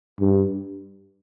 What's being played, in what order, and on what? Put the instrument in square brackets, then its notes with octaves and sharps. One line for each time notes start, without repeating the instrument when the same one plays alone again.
[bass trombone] G2